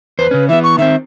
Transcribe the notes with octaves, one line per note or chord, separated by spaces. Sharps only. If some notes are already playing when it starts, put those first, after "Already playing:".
E2 B4 C5
C#3 C#4
E3 B3 E5
C#6
D#3 C4 E5